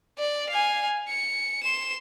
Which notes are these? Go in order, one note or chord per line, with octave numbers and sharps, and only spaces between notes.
D5
F5 G#5
C#7
C6 E7